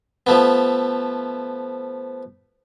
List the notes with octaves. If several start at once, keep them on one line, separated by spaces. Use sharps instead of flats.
F3 A3 B3